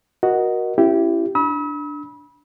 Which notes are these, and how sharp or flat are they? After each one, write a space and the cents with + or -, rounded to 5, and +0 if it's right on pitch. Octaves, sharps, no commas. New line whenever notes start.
F#4 +0 A#4 +20 D#5 +0
C#4 -20 E4 +25 G4 -15
D4 +0 B5 -25 E6 -45